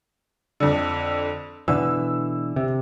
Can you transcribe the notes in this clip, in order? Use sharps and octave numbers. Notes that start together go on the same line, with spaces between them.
F2 D3
B2 D3 E3 E6
C3